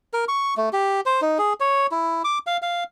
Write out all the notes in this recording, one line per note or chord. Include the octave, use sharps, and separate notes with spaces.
A#4
C#6
A3
G4
C5
D#4
G#4
C#5
E4
D6
F5
F5